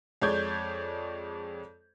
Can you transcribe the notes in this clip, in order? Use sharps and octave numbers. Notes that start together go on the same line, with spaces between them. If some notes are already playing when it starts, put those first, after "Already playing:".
F2 G#3 C#5 D5 G6 G#6